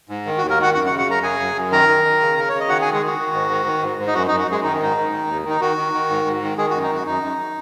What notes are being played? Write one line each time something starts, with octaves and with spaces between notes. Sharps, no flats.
G#2
D#3
F#4
D#2
A#3 A#4
D#3 F#4 F#5
F#2 F#4 F#5
F#4 F#5
C#3
F#4 F#5
F#2 A#4 A#5
C#3 G#4 G#5
F#2
F#2
D#3 A#4 A#5
D#3
D#3
C#3
C#3 A#4
C#3 C#5
D#5
D#3 F#4 F#5
G#4 G#5
D#3
G#3 G#4
D#3 F#4
D#3
G#2
D#3
D#3
G#2
G#2
D#4
F#2 F#4
F#2 D#4
F#4
F#2 G#3 G#4
D#3 D#4
G#2 D#4
D#3
D#3
D#2
D#3 D#4
D#3 F#4
D#3
D#3
G#2
G#2
D#3
D#3 G#3 G#4
F#4
F#2
D#4
F#2 F#4
F#2 D#4
F#2